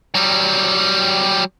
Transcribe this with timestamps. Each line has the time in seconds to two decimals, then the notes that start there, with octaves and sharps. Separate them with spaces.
0.15 F#3 G3